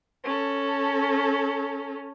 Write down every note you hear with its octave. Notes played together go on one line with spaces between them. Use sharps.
C#4 A4